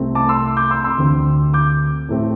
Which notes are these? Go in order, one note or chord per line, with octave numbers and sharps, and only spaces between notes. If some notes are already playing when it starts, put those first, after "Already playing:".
Already playing: C2 C3 A3 C4
A5 D6
C6 E6
D6 G6
C6 E6
C6 E6
D2 D3 C4
D6 G6
A2 A3 C4